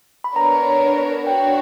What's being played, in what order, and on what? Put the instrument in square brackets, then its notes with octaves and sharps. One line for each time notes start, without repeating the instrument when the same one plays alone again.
[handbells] B5
[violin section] B3 D4 A#4 C#5 [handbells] A#5
[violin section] D4 F#4 C#5 [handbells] G5